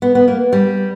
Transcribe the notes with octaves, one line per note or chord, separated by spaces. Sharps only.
B3
B3
A#3
G3